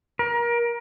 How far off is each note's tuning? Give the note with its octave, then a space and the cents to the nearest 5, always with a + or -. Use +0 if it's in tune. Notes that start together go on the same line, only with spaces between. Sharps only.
A#4 +25